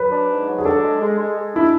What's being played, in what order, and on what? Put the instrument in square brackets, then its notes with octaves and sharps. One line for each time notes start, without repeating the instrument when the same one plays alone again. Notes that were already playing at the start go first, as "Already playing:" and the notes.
Already playing: [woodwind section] F#3 [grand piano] B4
[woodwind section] D4
G#2
F#3
[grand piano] G#4
[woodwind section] D4 [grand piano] A4
[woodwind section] G#3
G#3
G#3
G#3
[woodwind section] D4 [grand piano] E4